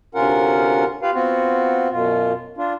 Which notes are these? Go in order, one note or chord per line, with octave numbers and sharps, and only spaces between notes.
D2 C3 C#4 F4 A#4 F#5
F4 G4 B4 F5
B3 C4 F4 F#4
F#2 B2 F4
D4 F4